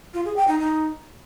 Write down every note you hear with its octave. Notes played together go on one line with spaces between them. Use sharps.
F4
G#4
G5
D#4
D#4